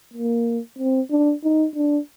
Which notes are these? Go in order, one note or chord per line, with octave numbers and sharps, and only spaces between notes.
A#3
C4
D4
D#4
D4